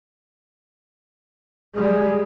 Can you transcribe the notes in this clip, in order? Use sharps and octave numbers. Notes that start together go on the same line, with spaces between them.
G3 G#3 G#4